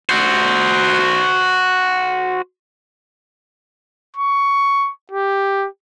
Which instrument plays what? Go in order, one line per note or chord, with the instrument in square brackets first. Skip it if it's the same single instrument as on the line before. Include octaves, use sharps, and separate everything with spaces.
[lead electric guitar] F#4 C5
[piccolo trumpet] C#6
G4